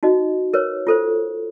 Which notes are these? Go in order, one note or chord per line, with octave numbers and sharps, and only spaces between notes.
D#4 F#4 D#5
A#4 B4 C#5
F4 A4 C5